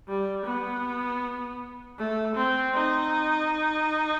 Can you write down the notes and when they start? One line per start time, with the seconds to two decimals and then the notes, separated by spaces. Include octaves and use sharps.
0.09 G3
0.46 B3
1.98 A3
2.35 C4
2.74 D#4